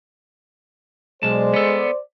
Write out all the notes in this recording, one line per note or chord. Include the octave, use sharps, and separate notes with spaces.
B1 G#3 C5 D5 A5
B3 A4